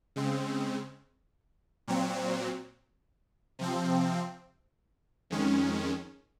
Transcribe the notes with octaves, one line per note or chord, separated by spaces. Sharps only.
C#3 G#3 C4
A#2 F#3 C4
C3 F3 C4
F2 D#3 G#3 C#4